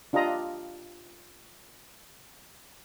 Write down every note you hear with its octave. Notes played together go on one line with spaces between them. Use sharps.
D4 F4 G4 D#5 A#5